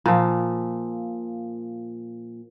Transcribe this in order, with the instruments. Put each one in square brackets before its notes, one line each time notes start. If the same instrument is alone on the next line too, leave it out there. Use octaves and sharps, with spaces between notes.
[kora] A#2 F3